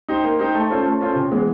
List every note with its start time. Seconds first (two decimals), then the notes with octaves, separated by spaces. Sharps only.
0.09 D#4 G4 C5
0.24 A#3
0.39 D#4 G4 C5
0.55 A3
0.70 C#4 F4 A4 C5
0.86 A3
1.01 C#4 F4 A4 C5
1.15 C3
1.31 E3 G#3 B3